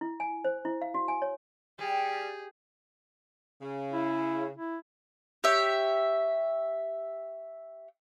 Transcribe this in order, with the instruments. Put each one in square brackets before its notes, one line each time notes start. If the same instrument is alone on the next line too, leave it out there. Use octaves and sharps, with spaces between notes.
[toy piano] E4
G#5
C5
E4
F5
F#4
G#5
C#5
[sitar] G3 [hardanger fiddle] G#4
[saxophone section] C#3
[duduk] E4
E4
[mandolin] G4 C#5 E5